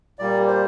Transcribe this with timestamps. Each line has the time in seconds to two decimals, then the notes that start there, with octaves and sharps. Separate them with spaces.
0.19 A#2 G3 A#3 D5
0.47 C5